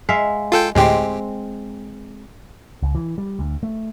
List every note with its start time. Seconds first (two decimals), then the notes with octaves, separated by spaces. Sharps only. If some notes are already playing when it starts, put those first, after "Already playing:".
0.09 G#3 E5 F5
0.52 F4 A4 G5
0.75 D2 A2 G#3 C4 G4
2.83 C#2
2.95 E3
3.18 G3
3.39 D2
3.63 A3